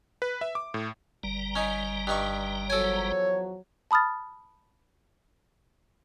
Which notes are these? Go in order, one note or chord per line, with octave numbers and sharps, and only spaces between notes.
B4
E5
D6
A2
G1 G3 A#5
C#4 D#4
G2 D#4 C#6
E2 F3 F#3 A4 C#5 G#5
A5 B5 D#6 F6 A6